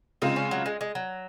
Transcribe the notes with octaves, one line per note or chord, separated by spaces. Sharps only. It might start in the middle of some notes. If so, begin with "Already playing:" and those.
C#3 G#3 C4 D#4 F4
C#4
F#3
G#3
G#3
F#3